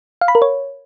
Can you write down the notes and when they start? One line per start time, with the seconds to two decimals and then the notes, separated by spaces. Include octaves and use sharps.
0.21 F5
0.28 B5
0.35 A#4
0.42 C#5